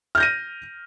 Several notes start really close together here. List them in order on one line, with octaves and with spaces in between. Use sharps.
F6 G6 A#6 D#7